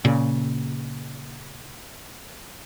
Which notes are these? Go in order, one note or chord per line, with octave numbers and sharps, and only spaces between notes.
A#2 C#3